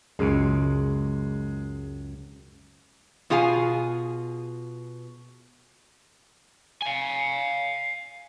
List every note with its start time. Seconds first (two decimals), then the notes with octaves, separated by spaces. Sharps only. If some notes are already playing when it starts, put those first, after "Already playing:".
0.19 C#2 F#2 G#3
3.30 B2 F4 G#4 F5 G#5
6.82 F5 G#5